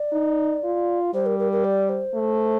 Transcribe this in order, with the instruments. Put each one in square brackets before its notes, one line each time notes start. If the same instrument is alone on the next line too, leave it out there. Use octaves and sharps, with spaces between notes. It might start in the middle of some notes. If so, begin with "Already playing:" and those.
Already playing: [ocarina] D5
[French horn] D#4
F4
[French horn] G3 [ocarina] C5
[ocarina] A#4
A#4
A#4
D5
C5
[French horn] A3